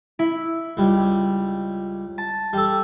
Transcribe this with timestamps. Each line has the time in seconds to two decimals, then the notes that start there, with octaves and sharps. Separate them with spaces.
0.19 E4
0.77 C#2 G3
2.18 A5
2.53 G3 A4